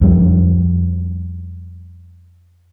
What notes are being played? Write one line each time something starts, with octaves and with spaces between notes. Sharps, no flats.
F2 G3